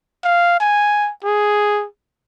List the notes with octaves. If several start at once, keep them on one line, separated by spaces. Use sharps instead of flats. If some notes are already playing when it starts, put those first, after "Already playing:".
F5
G#5
G#4